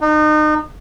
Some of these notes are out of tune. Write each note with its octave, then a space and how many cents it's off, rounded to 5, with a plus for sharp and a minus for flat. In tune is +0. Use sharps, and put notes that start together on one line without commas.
D#4 -35